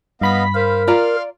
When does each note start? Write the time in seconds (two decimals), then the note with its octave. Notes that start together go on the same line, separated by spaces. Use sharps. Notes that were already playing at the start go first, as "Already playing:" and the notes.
0.21 G2 B3 D#5 F5 B5 B6
0.55 A#4 C5 F5
0.87 F4 D5 F5 A#5 C6 F6